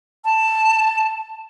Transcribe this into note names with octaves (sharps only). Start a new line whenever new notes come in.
A5